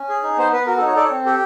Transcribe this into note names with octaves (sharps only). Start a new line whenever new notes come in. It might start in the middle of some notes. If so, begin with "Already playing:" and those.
Already playing: C#4
G#4
D#4
B3 C5
B3 B4
F#4 A#4
A4
D#4
C#5
A4 D5
C#5
C4
G4 A4